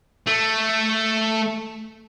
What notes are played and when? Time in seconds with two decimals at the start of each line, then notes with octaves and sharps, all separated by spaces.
0.27 A3